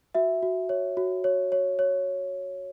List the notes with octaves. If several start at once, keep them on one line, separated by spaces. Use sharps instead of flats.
F#4 E5
F#4
C#5
F#4
C#5
C#5
C#5